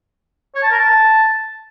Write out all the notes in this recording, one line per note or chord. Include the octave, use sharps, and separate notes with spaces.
C#5
A5
A#4
A5